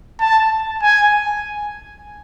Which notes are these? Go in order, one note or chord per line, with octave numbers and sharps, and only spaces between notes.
A5
G#5